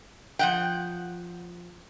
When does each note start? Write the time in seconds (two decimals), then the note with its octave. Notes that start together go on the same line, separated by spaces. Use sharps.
0.39 F3 F#5 G5